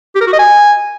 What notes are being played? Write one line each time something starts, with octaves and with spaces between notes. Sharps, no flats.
G4
A#4
F#4
D#5
G#5